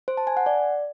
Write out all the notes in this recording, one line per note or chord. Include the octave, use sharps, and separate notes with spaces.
C5
A5
G#5
F#5
D5